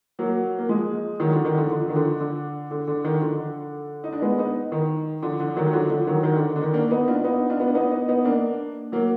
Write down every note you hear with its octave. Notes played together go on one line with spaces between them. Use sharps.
F#3 A#3
A#3
F3 G#3
D#3 F#3
D3 F3
D#3
D3 F3
D3 F3
D#3
D3 F3
D3
D3
D3
D#3
D3 F3
D#4
D4
G#3 B3
B3 D#4
D#3
D3 F3
D3 F3
D#3 F#3
F#3
D3 F3
D3 F3
D#3 F#3
D#3
D3
D3
D#3
A#3 D4
B3 D#4
D4 F4
B3 D#4
D4 F4
B3
D4
B3 D#4
B3 D#4
B3 D#4
A#3 D4
F#3 A#3